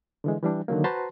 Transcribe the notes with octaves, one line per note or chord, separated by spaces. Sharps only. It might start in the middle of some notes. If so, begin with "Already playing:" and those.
D3 E3 G#3
E3 G3 D4
D3 D#3 F#3 A#3
F#4 B4 C5 A5 A#5 C6